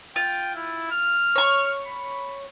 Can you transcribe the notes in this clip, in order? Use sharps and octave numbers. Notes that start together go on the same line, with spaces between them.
F4 G5
E4
F6
C#5 C#6
B5